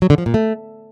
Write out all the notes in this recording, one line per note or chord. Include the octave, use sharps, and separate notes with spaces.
F#3
D3
F3
A#2
A3